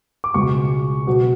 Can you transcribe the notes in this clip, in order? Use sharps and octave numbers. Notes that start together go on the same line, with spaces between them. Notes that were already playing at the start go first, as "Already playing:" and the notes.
D6
C#2 B2 G#3 B3 C#6
B2 F#3 B3